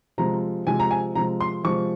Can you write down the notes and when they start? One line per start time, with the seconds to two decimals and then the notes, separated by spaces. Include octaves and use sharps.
0.18 C3 F3 G#3 A#5
0.67 C3 F3 G#3 G#5
0.80 A#5
0.91 G#5
1.15 C3 F3 G#3 A#5
1.41 C6
1.64 C3 F3 G#3 C#6